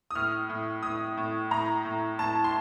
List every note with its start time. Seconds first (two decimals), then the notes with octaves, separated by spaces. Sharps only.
0.11 D#6
0.15 A2 F6
0.49 A2
0.83 A2 D#6
1.17 A2
1.51 A2 A#5
1.85 A2
2.19 A2 A5
2.44 C6